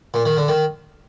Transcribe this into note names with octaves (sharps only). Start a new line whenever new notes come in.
A#2
D#3
D3
D#3